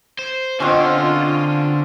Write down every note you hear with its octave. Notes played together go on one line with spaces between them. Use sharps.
C5
B2 D3 C4 C#4 F4